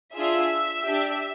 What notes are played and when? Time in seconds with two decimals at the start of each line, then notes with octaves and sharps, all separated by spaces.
0.15 D4 F4 G#4 E5
0.87 D4 G4